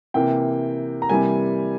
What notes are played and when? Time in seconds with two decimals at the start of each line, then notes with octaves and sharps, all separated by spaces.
0.14 C3 E3 A#3 G5
1.02 A#5
1.09 C3 E3 G3 A#3 G#5